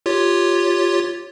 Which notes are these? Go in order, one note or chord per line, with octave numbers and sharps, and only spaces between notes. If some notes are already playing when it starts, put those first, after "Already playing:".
F4 G4 C#5